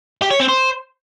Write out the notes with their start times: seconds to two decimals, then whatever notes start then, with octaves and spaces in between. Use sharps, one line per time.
0.22 G4
0.31 C#5
0.40 C4
0.49 C5